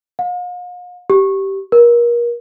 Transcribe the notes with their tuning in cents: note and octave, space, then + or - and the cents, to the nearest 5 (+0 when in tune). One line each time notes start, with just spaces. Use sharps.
F5 +45
G4 -15
A#4 +30